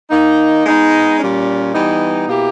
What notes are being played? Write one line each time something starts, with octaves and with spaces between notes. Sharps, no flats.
D#3 A#3 D#4
G#3 B3 D#4
A#2 G3 C#4
E3 G3 B3 D#4
B2 A#3 E4 G4